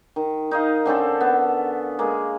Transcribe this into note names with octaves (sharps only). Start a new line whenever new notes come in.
D#3
D#4 D#5 F5
D3 C4 C#4 A4
B3
G#3 A#3